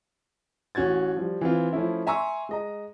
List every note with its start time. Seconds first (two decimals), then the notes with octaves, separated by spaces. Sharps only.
0.75 A1 C#4 F#4 G#6 A6
1.16 F3 G3
1.41 E3 C4 F4
1.73 F3 A3 C#4 E4
2.07 E5 G#5 A#5 C6 C#6 E6
2.49 G#3 D#5 A#5